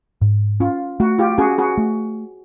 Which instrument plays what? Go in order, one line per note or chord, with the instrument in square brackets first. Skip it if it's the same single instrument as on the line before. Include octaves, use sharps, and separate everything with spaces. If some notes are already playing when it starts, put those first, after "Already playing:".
[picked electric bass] G#2
[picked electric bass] C#4 [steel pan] F4
[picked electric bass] A3 [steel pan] F#4
[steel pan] F4 G4
[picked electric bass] C#4 [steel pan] F#4 G#4
[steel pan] F#4 G#4
[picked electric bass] A3